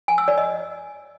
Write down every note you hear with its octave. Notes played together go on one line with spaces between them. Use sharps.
G#5
E6
D5
D#5